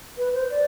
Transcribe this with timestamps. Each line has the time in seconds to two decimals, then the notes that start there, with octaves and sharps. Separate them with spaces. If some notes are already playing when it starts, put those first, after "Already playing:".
0.17 B4
0.34 C5
0.50 D5